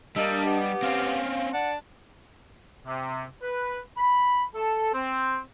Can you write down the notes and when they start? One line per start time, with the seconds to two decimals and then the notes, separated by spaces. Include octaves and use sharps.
0.16 G3 A#3 D4 D#5 A5 E6
0.45 B3 G4
0.83 C4 C#4 F5
1.53 D4 F#5
2.86 C3
3.43 B4
3.98 B5
4.55 A4
4.94 C4